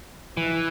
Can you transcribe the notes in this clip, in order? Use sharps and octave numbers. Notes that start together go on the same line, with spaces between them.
E3